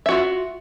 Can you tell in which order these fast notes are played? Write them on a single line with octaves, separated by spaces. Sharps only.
E5 F#4 F4